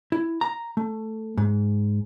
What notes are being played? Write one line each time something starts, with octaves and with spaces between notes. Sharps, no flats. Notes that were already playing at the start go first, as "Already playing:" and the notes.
E4
A#5
A3
G#2